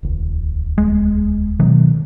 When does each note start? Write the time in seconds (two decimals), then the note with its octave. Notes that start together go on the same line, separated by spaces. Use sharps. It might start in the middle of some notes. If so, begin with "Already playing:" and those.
0.03 D#1 C#2
0.78 G#3
1.59 B2 D#3 F#3